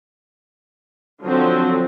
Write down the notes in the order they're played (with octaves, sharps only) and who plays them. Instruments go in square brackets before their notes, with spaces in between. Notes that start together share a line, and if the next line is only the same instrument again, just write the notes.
[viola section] D3 F3 F#3 C4